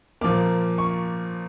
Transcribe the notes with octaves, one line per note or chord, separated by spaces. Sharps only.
A#2 F3 A#3 D6
C#6